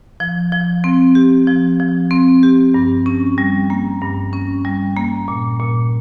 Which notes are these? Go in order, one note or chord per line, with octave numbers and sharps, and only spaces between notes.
F3
F3
C4
G4
F3
F3
C4
G4
G2
C#4
G3
A#3
G2
C#4
G3
A#3
A#2
A#2